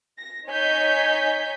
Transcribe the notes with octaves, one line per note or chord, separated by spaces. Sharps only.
A#6
D#4 C#5 G#5 G6 B6